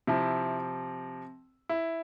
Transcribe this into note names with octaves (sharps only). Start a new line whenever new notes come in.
C3 F3 E4
E4